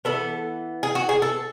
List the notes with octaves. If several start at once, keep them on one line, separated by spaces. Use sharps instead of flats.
E3 G#3 B3 A4
G#4
F#4
G#4
A4